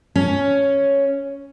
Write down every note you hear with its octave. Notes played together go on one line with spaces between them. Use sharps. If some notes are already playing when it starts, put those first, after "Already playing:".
C#4